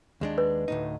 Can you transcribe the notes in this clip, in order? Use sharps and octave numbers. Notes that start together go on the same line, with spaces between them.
D#2 G#3 D4
B4
D2 A2 D#4